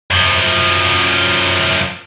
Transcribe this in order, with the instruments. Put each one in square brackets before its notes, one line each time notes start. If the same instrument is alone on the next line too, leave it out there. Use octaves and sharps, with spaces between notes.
[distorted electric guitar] F#2 F3